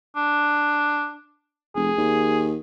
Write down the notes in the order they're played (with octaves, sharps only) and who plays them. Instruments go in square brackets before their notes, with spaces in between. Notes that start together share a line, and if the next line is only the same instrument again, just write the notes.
[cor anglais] D4
[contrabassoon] F1 [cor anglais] G#4
[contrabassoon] D#2